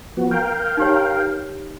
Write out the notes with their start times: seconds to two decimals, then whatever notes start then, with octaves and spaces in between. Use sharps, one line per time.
0.17 F3 B3 F#4
0.31 A#4 F5 G5
0.77 D#4 G4 C#5